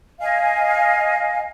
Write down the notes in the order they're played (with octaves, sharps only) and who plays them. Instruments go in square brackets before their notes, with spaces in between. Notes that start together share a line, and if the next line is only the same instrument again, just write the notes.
[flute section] D#5 F5 G#5